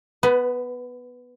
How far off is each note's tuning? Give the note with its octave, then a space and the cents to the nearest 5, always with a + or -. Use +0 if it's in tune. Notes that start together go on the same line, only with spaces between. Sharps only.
B3 +0 B4 +30 A#5 +0